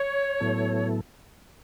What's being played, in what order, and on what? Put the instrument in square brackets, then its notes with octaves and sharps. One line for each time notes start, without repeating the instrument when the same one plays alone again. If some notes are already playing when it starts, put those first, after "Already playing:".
Already playing: [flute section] C#5
[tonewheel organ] A2 F#3 B3 E4 A4